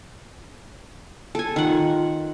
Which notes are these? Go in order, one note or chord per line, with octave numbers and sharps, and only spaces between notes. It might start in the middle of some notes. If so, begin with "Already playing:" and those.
A4 G#5
D#3 F4 F#5